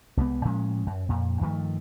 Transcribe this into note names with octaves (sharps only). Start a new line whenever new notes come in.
C2 G3 G#3 B3
A2 F3 G#3 C#4
F#2
F2 A#2
G2 D#3 F3 A3